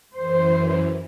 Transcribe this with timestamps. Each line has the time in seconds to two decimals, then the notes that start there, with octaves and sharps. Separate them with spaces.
0.15 F#2 E3 C5